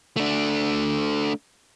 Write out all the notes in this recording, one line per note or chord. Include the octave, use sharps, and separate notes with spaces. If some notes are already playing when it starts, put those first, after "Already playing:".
A3 D4